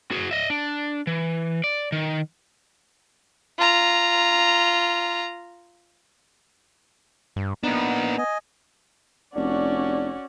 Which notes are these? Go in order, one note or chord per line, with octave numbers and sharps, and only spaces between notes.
F#4 G#4
D#5 E5
D4
E3
D5
D#3
F4 A#5
G2
A#3 B3 D4 D#4
D#5 G#5
F1 C#4 D4 F#4 D5